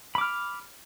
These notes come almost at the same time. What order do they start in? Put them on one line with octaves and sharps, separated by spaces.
B5 D6 F6